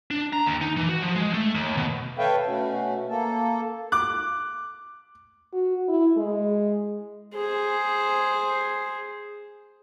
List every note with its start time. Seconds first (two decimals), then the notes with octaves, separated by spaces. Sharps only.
0.11 D4
0.33 A#5
0.46 D#2
0.61 D#4
0.77 E3
0.89 F#4
1.02 F3
1.15 G#3
1.33 A3
1.54 D#2
1.77 B2
2.18 A4 B4 C#5 E5 F5 G5
2.47 B2 A3 C#4 F#4
3.08 A#3 A4
3.92 D6 F#6
5.54 F#4
5.88 E4
6.17 G#3
7.35 G#4 C5